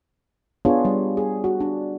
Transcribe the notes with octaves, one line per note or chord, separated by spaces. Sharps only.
B3 D4 F4 G#4 C#5
G3
G#4
F#4
D4